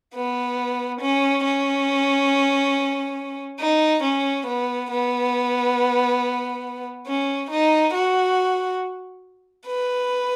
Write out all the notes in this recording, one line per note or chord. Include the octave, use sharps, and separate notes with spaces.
B3
C#4
C#4
D#4
C#4
B3
B3
C#4
D#4
F#4
B4